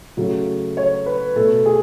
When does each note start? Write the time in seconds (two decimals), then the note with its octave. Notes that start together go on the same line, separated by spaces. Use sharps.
0.17 C#3 F#3 A3
0.77 C#5
1.06 B4
1.36 B2 A3 A4
1.66 G#4